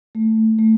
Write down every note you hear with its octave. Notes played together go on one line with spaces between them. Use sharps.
A3
A3